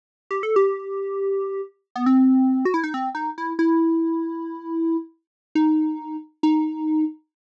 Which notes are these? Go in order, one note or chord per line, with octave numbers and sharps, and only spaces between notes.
G4
A4
G4
B3
C4
F#4
E4
D#4
C4
D#4
E4
E4
D#4
D#4